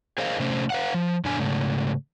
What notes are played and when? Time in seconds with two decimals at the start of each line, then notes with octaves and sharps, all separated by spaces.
0.18 G#4 A#4 C5 D#5 F5
0.40 C3 A3 C#4 C5
0.70 B4 F5 F#5
0.94 F3
1.25 F#2 A#2 D3 D4 G#5
1.40 G#2 C#3 A3